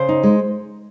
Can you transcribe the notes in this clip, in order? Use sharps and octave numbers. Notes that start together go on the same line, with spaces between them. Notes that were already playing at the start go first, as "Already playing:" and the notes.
Already playing: C#3 C5
D#4
G#3